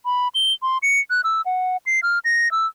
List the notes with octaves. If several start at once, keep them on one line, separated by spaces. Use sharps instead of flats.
B5
G7
C6
C#7
F#6
E6
F#5
C7
F6
A#6
E6